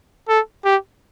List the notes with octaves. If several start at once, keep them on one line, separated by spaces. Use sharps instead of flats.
A4
G4